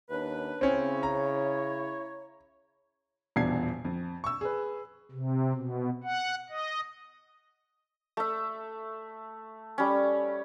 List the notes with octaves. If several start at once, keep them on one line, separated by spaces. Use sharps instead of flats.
D#2 C#4 D4 B4
C#3 C4 C#4 E4 C#5
A#5
D#1 E2 B2 D4 G#6 C7
F2
C#6 E6
G#4 B4
C3
B2
F#5
D#5
A3 E5
G3 C#4